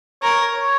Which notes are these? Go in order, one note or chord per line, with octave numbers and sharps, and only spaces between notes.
A#4 C#5
C#5